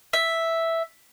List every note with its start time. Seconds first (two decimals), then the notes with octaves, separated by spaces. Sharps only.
0.13 E5